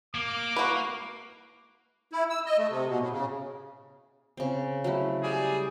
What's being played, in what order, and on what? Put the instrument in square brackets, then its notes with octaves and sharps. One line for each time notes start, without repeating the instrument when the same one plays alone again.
[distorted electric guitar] A#3 [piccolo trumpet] D6
[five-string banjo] F#4 B4
[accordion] E4
E6
D#5
A3
C3
B2
A2
C#3
[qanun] C#3 C4
F#3 A3 E4
[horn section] G3 G#4